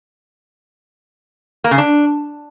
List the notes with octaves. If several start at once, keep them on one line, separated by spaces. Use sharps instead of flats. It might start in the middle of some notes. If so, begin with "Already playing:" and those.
A#3
C#3
D4